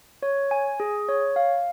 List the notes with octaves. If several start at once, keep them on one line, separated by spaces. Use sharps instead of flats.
C#5
G#5
G#4
C#5
F5